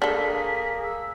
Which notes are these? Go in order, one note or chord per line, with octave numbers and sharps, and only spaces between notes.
A#3 D4 G#4 A4 B6
E6